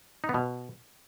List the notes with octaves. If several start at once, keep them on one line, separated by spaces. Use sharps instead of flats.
D#4
B3
B2